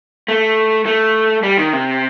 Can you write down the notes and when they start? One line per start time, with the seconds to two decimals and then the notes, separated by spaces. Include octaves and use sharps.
0.28 A3
0.86 A3
1.43 G3
1.58 D#3
1.73 C3